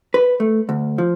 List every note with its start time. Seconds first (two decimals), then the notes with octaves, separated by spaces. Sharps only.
0.14 B4
0.40 A3
0.69 D2
0.98 F3